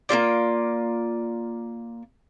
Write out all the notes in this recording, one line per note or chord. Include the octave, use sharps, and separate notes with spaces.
A#3 E4 F4 D5